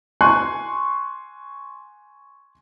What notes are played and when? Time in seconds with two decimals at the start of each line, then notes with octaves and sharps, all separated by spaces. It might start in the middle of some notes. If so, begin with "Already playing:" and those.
0.21 G#5 C6 C#6 F#6